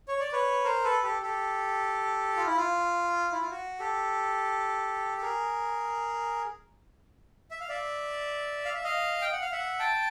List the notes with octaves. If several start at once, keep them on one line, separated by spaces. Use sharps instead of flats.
C#5
D5
B4 C#5
A#4 C5
A4 B4
G4 A4
G4 A4
F4
E4
F4
E4
F4
F#4
G4 A4
A4
G#4 A#4
E5
F5
D5 E5
F5
E5
D#5 F5
G5
F#5
F5
E5 F#5
G5 A5